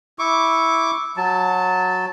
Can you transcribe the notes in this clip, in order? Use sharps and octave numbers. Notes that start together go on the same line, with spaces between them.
E4 C#6 D6
F#3 A5